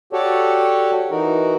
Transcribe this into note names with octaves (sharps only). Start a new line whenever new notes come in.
F#4 G4 A4 C#5 D5
E3 D#4 F#4 A#4